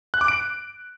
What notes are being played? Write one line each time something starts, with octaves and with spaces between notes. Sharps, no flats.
F#6
D6
D7